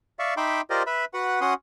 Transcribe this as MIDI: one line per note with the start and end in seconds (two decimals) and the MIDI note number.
0.19 0.34 74
0.19 0.34 76
0.19 0.34 77
0.19 0.34 85
0.37 0.61 63
0.37 0.61 76
0.37 0.61 79
0.37 0.61 83
0.37 0.61 84
0.37 0.61 86
0.70 0.83 65
0.70 0.83 67
0.70 0.83 70
0.70 0.83 72
0.70 0.83 74
0.70 0.83 75
0.86 1.05 71
0.86 1.05 76
0.86 1.05 83
1.14 1.41 66
1.14 1.41 71
1.14 1.41 78
1.41 1.54 61
1.41 1.54 66
1.41 1.54 78
1.41 1.54 84
1.41 1.54 87